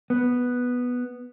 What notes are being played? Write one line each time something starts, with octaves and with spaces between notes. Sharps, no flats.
B3